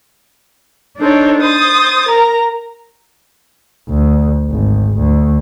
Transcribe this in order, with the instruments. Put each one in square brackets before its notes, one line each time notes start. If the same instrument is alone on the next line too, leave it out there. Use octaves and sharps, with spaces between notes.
[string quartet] D4 D#4 A4 C5 C#5
C5 D#6 A6
A#4 A#5
[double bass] D2
G#1
D2